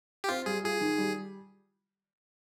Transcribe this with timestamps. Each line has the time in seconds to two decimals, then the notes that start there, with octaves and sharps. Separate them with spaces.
0.24 G4
0.29 C4 F4
0.46 G3 G#4
0.64 F4 G#4
0.81 D#3
0.98 G3